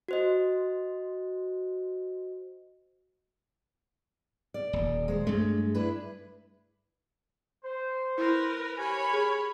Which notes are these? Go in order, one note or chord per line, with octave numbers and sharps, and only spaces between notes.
F#4 C5 D#5
D5
D#1
G#3 C5
G2 G#3 A3
D4 E4 B4
C5
E4 A#4 B4
G4 A#4 C#5 G#5 B5
G#4